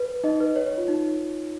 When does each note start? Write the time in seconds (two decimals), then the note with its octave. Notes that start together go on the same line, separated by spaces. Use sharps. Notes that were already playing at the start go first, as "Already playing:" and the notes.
Already playing: B4
0.24 D#4 D#5
0.40 B4
0.56 C#5
0.66 C#5
0.78 F4
0.88 D#4